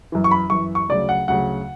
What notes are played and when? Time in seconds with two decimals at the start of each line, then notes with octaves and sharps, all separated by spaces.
0.12 F#2 E3
0.24 C#6
0.31 B5
0.50 F#2 E3 C#6
0.75 C#6
0.89 D2 C#3 F#3 D5
1.09 F#5
1.28 D2 C#3 F#3 F#5